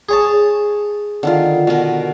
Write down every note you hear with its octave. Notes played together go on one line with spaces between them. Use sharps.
G#4 C#5 A5
D3 D#3 F4
B2 A#4